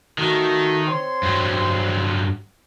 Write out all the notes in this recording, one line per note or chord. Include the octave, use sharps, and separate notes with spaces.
D#3 A3 F#4
C4 C#5 C6
G2 F#3